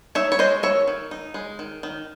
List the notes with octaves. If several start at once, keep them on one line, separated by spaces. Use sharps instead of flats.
D#4 C#5 E5
C#5
G#3 C5 D#5
D#3 C#5 E5
D#3
D#4
G#3
D#3
D#3